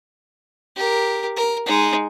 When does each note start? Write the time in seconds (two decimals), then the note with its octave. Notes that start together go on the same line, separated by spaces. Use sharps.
0.76 G4 A#4
1.36 A#4
1.66 G#3 D#4